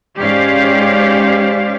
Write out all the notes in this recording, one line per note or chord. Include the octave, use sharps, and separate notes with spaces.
G#2 C#4 G4 C5 D5 F5